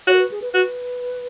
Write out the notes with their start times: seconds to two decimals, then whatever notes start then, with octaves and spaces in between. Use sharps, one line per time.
0.07 F#4 C#5
0.13 A#4
0.19 B4
0.31 G#4
0.42 B4
0.54 F#4 B4